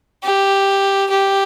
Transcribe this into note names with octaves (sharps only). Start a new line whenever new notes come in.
G4
G4